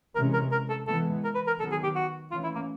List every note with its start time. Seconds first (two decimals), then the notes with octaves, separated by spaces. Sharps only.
0.15 C3 E3 G#3 C#4 A#4
0.33 A#4
0.52 A#4
0.70 A4
0.87 E3 G#3 B3 A4
1.24 A#4
1.35 B4
1.47 A#4
1.59 D#3 F#3 B3 A4
1.71 G#4
1.84 G4
1.95 F#4
2.31 E3 A3 C#4 F4
2.44 E4
2.55 A#3